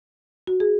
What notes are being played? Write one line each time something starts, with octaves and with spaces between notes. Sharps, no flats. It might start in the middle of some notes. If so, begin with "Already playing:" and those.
F#4
G#4